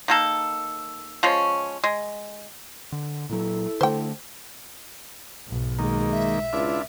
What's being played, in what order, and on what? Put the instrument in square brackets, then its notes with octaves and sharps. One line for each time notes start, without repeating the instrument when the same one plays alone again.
[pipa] D#3 A#3 A4
F3 G#3 C#4
G#3
[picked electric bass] D3
[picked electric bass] A#2 F#3 [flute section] E4 A4
[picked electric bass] D3 A3 [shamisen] C5 G5
[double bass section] B1 G#2
[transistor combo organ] D#3 A#3 [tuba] G#3
[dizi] E5
[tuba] C#2 [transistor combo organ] D4 E4 F4